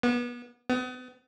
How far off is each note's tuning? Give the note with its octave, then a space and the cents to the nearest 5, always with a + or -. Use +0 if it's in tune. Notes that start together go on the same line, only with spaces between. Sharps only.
B3 -30
B3 +35